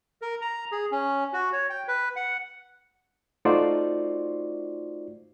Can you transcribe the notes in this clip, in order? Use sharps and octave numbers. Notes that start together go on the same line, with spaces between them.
A#4
A#5
G#4
C#4
F#4
C#5
G5
B4
F#5
A3 D#4 F4 F#4 C5 D5